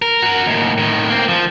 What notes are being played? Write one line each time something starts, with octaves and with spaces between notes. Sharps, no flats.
A#4
F#4 A#4
D#2 A2
A2 D#3
A#3 C4
F3